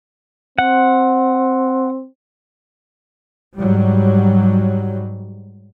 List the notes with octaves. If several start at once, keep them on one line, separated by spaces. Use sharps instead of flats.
C4 F#5
G#2 F#3 G3